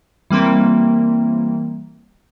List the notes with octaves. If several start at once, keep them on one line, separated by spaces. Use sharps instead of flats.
E3 G3 A#3 C4